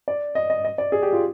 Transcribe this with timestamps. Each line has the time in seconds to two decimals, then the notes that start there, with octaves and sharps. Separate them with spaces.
0.08 D5
0.35 D#5
0.50 D#5
0.65 D#5
0.78 D5
0.92 G#4
1.03 G4
1.13 F4